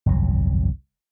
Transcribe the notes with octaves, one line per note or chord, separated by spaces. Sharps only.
G1 C2 F2 F#3